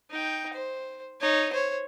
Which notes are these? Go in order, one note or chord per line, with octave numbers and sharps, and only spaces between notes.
D#4 G5
C5
D#4 C#5
C5 C#5